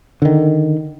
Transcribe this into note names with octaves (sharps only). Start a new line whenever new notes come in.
D3 D#3